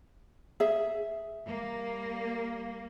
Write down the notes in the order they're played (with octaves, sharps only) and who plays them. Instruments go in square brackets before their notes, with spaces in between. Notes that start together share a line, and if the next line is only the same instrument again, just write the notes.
[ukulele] G#4 E5
[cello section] G3 A#3